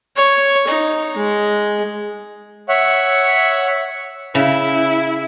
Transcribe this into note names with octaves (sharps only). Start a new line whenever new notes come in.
C#5
D#4
G#3
C#5 E5 F#5
C#3 E4